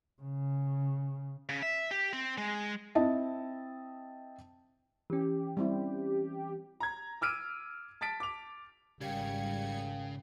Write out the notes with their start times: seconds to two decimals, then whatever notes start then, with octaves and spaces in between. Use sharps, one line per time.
0.22 C#3
1.49 C#3
1.63 E5
1.91 G4
2.13 C4
2.38 G#3
2.95 C4 E4 D#5 E5 A5
5.10 E3 C#4 G4
5.57 G3 C4 E4
6.80 A#5 G#6
7.21 D6 E6 F6 D7 D#7
8.01 A5 A6 B6 D7
8.20 D6 F7
9.01 G#1 C#3 G3 A#4 F5 G5 G#6 C#7